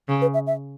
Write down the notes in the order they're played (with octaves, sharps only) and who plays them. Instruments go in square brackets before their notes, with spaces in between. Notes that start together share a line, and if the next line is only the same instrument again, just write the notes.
[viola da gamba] C#3
[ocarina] B4
E5
E5